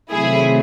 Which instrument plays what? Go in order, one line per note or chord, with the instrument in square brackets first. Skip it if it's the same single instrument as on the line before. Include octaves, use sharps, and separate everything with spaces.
[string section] C3 D#3 F#3 A3 E4 G#4